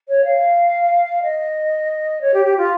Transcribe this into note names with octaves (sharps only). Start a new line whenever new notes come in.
C#5
F5
D#5
C#5
G4
G4
F4